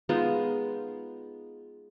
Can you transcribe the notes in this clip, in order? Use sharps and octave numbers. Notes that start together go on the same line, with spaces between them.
G#3 B3 D#4 F4